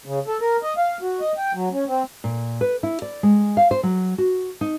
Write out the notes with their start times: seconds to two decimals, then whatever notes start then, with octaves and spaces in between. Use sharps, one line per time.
0.06 C#3
0.27 A4
0.41 A#4
0.63 D#5
0.78 F5
1.02 F#4
1.20 D#5
1.37 G5
1.54 F#3
1.72 C#4
1.88 C4
2.24 A#2
2.61 B4
2.83 E4
3.02 D5
3.23 G#3
3.57 F5
3.71 C5
3.83 F#3
4.18 F#4
4.61 D#4